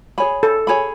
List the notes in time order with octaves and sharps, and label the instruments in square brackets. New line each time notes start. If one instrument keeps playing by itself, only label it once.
[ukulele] G#4 C#5 G#5 B5
[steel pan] A4
[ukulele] G#4 C#5 G#5 B5